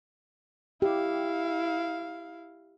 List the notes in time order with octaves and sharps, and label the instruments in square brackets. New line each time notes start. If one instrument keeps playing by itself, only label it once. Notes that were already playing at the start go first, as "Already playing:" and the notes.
[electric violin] E4 F5 [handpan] G4